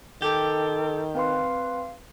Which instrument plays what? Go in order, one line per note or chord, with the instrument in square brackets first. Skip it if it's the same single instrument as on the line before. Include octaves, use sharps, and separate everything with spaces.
[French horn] D#3 [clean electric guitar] G4 [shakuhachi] A4 [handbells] G6
[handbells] C4 B4 C6 [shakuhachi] F5